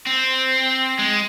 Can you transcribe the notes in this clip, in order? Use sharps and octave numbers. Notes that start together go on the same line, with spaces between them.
C4
G#3